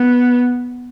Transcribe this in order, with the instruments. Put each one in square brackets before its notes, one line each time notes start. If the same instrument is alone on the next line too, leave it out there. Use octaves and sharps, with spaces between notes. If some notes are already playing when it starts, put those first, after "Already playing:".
Already playing: [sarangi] B3